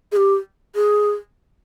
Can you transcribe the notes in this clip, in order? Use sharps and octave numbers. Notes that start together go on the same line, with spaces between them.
G#4
G4
G#4